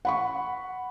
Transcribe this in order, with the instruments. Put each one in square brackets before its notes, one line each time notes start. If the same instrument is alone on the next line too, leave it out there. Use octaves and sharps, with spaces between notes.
[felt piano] F#5 B5 C#6